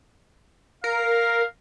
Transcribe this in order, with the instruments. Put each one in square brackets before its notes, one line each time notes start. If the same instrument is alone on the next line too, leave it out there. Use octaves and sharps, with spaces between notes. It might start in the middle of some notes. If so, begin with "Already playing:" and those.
[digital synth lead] A#4 [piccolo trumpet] F5